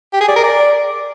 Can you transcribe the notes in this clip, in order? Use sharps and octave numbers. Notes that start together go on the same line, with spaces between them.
G4
G#4
D5
A#4
D5